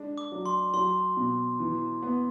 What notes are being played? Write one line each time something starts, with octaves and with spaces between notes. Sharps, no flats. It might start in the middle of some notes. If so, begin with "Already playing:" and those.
Already playing: G#3 D4
D6
F#3
C6
F#3 C6
B2
E3
B3